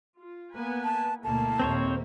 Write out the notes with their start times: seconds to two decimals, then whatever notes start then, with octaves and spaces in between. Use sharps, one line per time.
0.18 F4
0.55 A#3 B3 B4 G#5
0.84 A5
1.24 D2 B2 A3 A#3 E4 A5
1.60 D#2 A#2 C4 C5 C#5